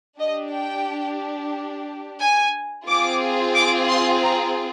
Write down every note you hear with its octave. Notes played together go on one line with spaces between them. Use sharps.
D4 G4 D#5
G5
G#5
C4 F4 G#4 D6
D6
C6
A#5